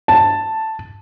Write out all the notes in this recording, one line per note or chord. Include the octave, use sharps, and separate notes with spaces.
A5